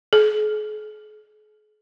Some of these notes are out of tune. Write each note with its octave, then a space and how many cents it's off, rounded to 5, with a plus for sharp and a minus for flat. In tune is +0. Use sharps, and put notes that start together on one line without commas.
G#4 +40